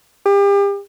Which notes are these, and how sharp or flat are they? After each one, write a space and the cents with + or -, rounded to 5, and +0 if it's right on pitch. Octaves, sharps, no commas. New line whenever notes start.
G4 +35